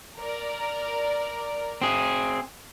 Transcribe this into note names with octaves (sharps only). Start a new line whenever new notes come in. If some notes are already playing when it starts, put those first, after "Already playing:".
A#4 D5
C4 G#4